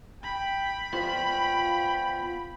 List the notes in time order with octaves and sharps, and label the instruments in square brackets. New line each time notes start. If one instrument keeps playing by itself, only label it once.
[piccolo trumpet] G5 [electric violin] B5
[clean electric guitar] B3 F4 C5 [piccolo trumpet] G5